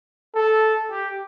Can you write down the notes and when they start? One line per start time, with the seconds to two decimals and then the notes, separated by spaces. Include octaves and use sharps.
0.34 A4
0.90 G4